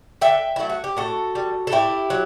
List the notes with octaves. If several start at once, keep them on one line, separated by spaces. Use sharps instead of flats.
D3 E5 G5
F#3 A3 E4
F#4
G4
A2 F#4 A4
G3
A4
A2 E4 G4
F#3